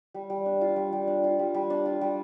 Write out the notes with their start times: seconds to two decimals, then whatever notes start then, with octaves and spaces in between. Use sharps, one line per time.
0.14 G3
0.30 G3
0.46 D4
0.61 F4
0.76 G3
0.92 G3
1.07 D4
1.24 F4
1.39 G3
1.54 G3
1.70 D4
1.85 F4
2.01 G3